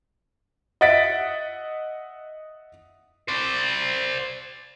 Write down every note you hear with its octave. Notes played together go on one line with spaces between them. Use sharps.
D#5 E5 F#5 A6 B6 D7
C5 D5